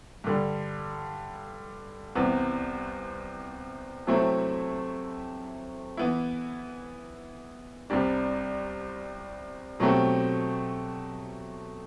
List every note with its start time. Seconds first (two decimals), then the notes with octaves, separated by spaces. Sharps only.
0.24 G2 D3 G3
2.15 C2 C3 E3 B3
4.07 C3 F#3 A3 C4 E4
5.97 E3 B3 E4
7.90 C2 C3 G3 D4
9.80 B2 F#3 A3 C4 G4